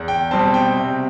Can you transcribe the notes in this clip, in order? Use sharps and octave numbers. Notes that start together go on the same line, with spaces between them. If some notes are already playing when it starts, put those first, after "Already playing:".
Already playing: E2
G5
B2 G3 C4 A5
G5
C3